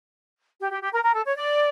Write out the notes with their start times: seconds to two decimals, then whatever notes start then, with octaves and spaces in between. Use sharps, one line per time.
0.60 G4
0.71 G4
0.81 G4
0.93 A#4
1.03 A#4
1.14 A4
1.25 C#5
1.36 D5